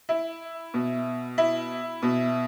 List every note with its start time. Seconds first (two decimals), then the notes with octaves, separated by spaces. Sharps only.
0.09 E4
0.74 B2
1.38 E4
2.02 B2